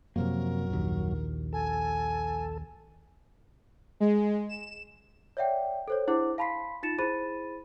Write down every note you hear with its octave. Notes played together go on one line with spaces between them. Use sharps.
F#2 C3 F3 F#3 A#3 A#4
A#1 D#2
A4 G#5
G#3
E7
C#5 D5 E5 F#5 G5
A4 C5 C#5
D4 E4 G#4 C5 F#5 D6
F5 A5 B5 C6 B6 C7
D#4 F4 A6 C#7 E7
E4 G#4 C5 B5 A6 D#7